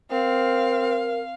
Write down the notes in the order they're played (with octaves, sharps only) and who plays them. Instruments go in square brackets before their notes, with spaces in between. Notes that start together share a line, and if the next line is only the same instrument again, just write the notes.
[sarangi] C4 [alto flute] A#4 [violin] F5